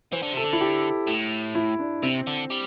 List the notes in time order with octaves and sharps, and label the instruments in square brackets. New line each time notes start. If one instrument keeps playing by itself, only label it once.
[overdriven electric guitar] E3 [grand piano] C5
[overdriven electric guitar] D3
[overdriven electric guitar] C3 [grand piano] A4
[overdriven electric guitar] D3
[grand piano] E4
G4
[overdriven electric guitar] A2
[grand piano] E4
D4
[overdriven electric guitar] C3 [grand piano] C4
[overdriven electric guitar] D3
G3